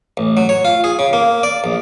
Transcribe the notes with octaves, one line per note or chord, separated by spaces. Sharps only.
A1
F#3
C#5
F4
G#4
C#3
A#3
D5
A#1